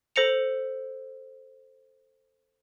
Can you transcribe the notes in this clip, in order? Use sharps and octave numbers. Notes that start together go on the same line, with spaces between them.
A4 C5 A#6 C#7 F7